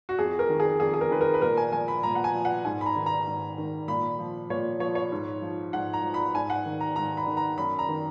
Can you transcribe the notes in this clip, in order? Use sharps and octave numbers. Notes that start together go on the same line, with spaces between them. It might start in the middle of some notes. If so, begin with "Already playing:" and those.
F#4
F2 G#4
A#4
D#3
G#4
F2 G#4
G#4
A#4
D#3 B4
A#4
B4
A#2 A#4
G#5
F3 G#5
B5
A#2 A#5
F#5
G#5
F3
F#5
G#2 G#5
B5
A#5
D#3
A#5
G#2
D#3
A#2 B5
F3
A#2 C#5
F3 C#5
C#5
G#2
F3
G#2 F#5
A#5
F3
B5
G#2 G#5
F#5
D#3
A#5
G#2 A#5
B5
D#3
A#5
F#2 B5
A#5
D#3